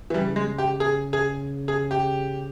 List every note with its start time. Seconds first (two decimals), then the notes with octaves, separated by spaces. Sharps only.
0.10 E3
0.14 C#3 G3
0.36 G#3
0.58 G4
0.80 G#4
1.13 G#4
1.68 G#4
1.91 G4